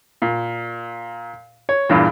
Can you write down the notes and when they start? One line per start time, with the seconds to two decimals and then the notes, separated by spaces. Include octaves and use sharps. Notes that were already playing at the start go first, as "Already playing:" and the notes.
0.22 A#2
1.69 C#5
1.89 E2 G2 A#2